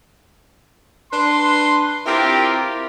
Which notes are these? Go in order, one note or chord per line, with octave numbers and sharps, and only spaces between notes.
D4 B4 C6
C4 E4 F4 G4 A#4